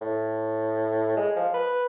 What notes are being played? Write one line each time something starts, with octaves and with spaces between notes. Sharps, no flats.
A2
G#3
F3
B4